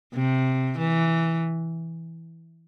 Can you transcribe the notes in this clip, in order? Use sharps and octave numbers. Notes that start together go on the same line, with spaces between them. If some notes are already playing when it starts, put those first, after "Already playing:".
C3
E3